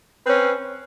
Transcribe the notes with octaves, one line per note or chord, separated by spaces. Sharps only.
C4 C#4 B4